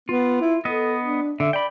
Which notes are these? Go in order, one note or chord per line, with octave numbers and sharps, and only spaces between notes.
B3 F4
E4
B3 A4 D#5
D4
D3 E5
D5 G5 B5